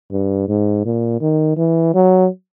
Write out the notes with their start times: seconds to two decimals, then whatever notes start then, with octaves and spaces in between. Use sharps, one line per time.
0.12 G2
0.48 G#2
0.85 A#2
1.21 D#3
1.57 E3
1.94 F#3